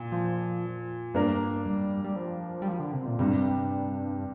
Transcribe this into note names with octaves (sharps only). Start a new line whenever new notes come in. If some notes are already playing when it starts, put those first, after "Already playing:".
Already playing: A#2
F3
G2 A#3 D4 A#4
G3
G3
F3
G3
F3
D3
C3
A#2
G2 C3 G3 D4